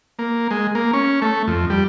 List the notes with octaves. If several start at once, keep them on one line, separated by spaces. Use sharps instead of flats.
A#3
G#3
A#3
C#4
A3
F2
G3